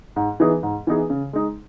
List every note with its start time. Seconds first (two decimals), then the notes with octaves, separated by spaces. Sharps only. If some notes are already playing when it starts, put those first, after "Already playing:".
0.16 G#2
0.40 E3 B3 D#4 G#4
0.63 G#2
0.87 E3 B3 D#4 G#4
1.10 C#3
1.33 G#3 D#4